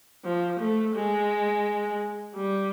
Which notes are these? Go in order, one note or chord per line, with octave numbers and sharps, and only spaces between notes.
F3
A3
G#3
G3